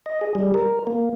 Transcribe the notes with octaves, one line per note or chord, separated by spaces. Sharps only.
D#5
G#4
G3
A#4
A#3